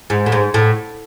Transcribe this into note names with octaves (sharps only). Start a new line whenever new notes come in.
G#2
A2
G#2
A2